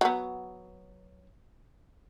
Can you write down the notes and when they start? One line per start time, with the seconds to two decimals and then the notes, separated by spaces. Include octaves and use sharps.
0.01 F#3 B3